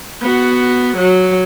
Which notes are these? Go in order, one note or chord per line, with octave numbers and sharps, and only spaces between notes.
B3 F#4
F#3